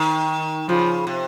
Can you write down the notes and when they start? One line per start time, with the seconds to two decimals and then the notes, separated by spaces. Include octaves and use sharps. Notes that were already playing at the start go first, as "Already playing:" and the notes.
Already playing: D#3
0.69 C#3 F3
1.07 C3